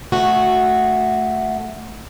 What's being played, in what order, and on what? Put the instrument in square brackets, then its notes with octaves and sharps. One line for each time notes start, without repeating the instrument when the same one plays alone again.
[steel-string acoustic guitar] A3 F#4